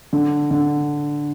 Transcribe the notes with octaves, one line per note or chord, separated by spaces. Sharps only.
D3
D3